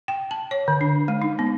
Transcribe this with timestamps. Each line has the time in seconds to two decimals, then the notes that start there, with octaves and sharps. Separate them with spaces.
0.08 G5
0.31 A5
0.51 C#5
0.68 D3
0.81 D4
1.08 G#3
1.22 D#4
1.39 B3